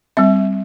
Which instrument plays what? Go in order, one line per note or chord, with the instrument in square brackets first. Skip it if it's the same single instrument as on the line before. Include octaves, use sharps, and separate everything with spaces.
[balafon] G3 C4 E5